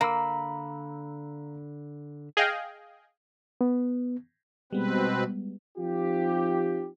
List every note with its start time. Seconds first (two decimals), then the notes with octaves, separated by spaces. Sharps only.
0.01 D3 A#3 A#5 B5 E6
2.37 G#4 D#5 F5 G5
3.61 B3
4.73 B2 G3 G#3 B3 C4 B4
5.78 F3 C4 D#4 F4 G4